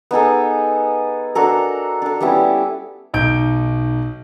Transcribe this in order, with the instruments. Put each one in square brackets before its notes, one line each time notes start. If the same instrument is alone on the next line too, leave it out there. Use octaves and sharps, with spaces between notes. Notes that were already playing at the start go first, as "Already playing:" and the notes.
[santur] B3 D#4 G#4 A4
D4 F#4 A4 A#4
D4 A4
G3 B3 C#4 E4
[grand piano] B1 D#4 G6 D7